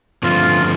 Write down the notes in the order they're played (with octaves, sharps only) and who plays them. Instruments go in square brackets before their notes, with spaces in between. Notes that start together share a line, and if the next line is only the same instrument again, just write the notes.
[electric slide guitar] G2 D3 F3 A3 C4 [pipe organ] F4